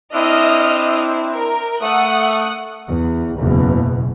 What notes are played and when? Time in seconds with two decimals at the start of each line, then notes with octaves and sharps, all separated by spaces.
0.14 C4 D4 E4 D#5 D#6 F6
1.35 A#4
1.82 A3 F#5 D#6 F#6
2.87 E2
3.38 F#1 E2 B2